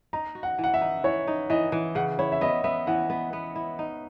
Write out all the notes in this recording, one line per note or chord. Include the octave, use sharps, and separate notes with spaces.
D#4 A#5
F#4
F#5
E3
F#5
E5
D#4
E3 C#5
D#4
E3 D#5
E3
C#3 F#5
E4 C#5
E5
B3 D#5
B3 E5
E3 F#5
B3
B3
E4
D#4